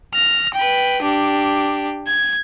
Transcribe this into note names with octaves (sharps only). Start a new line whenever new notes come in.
F6 A#6
B4 G5
D4 G4
G#6